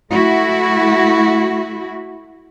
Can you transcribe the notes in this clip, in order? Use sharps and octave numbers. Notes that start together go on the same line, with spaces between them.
A3 E4 F#4